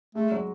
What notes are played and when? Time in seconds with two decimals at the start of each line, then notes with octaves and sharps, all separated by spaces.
0.15 G#3 A3
0.31 F#3